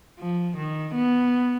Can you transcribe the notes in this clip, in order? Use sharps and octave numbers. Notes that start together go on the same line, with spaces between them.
F3
D#3
B3